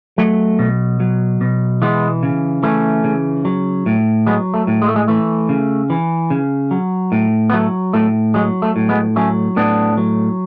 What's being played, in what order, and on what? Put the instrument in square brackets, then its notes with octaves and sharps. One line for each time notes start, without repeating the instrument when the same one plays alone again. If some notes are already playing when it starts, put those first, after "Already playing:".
[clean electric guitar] F#3 A3
B2
F#3
B2
E3 G#3 B3
C#3
E3 A3 C#4
C#3
F#3
A2
F#3 G#3 B3
A3
A2
G#3
A3
G#3
E3 A3
C#3
E3
C#3
F#3
A2
B3
F#3 A3
A2 A3
F#3 G#3
A3
A2
G#3 B3
F#3 A3 C#4
A2 B3 D4
F#3